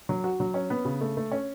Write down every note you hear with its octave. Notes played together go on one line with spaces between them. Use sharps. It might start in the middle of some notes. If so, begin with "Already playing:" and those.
F#3
F#4
F#3
C#4
B3
C#3
A3
A3
C#4